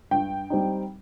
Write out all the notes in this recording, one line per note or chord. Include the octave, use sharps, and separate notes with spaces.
G2 G5
G3 C4 D#4